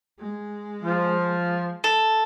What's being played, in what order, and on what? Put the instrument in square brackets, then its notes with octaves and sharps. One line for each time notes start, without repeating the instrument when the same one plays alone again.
[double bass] G#3
[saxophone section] F3
[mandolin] A4